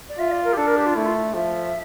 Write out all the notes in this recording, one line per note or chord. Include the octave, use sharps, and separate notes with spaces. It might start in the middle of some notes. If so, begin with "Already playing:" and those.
D5
F4 E5
D5
A#4
G4
D4 A4
A#4
G4
F4
A3 E4
F4
F3 E5